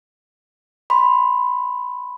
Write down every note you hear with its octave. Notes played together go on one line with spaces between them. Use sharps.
B5 C6